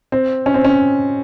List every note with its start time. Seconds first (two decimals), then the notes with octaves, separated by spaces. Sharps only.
0.12 C4
0.46 C#4
0.54 C4
0.64 C#4